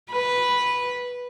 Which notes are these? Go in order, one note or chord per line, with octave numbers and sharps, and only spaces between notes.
B4